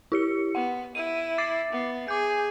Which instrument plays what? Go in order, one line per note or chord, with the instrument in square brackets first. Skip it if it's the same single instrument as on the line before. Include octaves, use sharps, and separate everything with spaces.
[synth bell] E4 G4 C#7
[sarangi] B3 [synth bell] F#5
[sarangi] E4 [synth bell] D#7
[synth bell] D6 A6 C7
[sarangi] B3
[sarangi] G#4 [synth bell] D6 G6